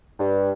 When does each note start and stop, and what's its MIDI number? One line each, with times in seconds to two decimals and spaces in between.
0.19 0.51 43